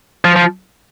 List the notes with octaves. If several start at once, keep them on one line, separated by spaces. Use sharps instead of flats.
F3
F3